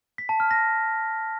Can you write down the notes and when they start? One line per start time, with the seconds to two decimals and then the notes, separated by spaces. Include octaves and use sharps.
0.18 B6
0.29 A5
0.40 F6
0.51 A#6